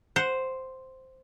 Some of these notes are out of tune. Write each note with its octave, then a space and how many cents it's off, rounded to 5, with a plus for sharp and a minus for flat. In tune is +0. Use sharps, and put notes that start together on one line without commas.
C5 +0 F#5 +0